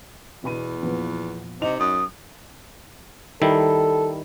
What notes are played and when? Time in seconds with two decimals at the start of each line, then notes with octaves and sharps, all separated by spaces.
0.44 E2 B2 B5 D#7
0.83 A#2 F3 B3
1.62 C3 D#4 D#5 F7
1.79 F#2 D#6
3.42 D#3 G3 E4 A4